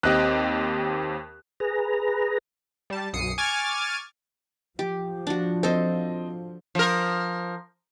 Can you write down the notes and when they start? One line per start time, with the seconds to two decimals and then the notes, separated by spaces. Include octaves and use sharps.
0.03 D#2 C4 G4 D#5 F#6
1.60 G#4 B4 A#5
2.90 G3 A5
3.13 B1 F#2 D#6 C7 C#7
3.38 G#5 C#6 D6 F6 G#6 A6
4.79 F3 G4
5.27 D4 F#4
5.63 C4 A4 C5 D#5
6.75 F3 A#4